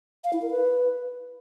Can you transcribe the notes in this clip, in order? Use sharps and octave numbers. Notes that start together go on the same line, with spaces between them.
F5
E4
A#4
B4